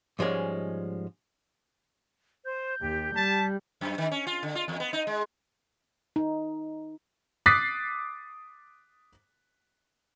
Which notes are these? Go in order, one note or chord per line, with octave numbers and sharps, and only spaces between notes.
G#2 F3 G3 G#3 C#4
C5 G6
D#2 G4
G3 A5 B6
F#2
D#3
C#4
F4
D3
F4
E2
B3
D#4
G#3
D#4
D6 D#6 F#6 A6 B6 C7